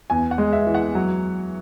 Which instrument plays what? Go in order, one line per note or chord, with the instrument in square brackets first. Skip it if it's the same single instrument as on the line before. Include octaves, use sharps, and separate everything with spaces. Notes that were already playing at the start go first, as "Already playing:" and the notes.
[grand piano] E2 G#5
F#5
G#3
E5
E3
F#5
F#3